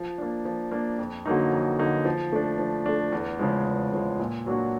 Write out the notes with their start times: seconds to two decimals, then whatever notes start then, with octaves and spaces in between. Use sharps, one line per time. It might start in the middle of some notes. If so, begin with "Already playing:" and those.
Already playing: F3
0.18 A#3 D4
0.45 F3
0.71 A#3 D4
0.99 F2
1.26 D3 F#3 A#3 D#4
1.52 F2
1.78 D3 F#3 A#3 D#4
2.05 F3
2.32 A3 D4
2.59 F3
2.86 A3 D4
3.12 E2
3.39 C#3 F3 G#3
3.66 E2
3.92 C#3 F3 G#3
4.19 A#2
4.46 F#3 A#3 D4 F#4